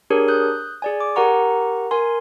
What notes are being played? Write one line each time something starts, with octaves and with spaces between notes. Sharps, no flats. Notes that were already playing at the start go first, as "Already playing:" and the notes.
D4 G4 G#4 A#4 C#5
D#6 F#6 G6
G#4 D5 G#5
D6
G4 A#4 F#5 A#5 C#6
A#4 G#5 C6